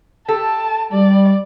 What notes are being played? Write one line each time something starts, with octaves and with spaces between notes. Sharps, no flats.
G4 A4 A5
G3 D5